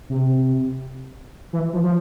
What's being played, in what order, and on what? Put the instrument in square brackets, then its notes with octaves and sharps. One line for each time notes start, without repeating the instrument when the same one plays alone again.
[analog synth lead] C3
E3
F3
F3